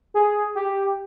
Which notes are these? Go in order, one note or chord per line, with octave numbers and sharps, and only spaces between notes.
G#4
G4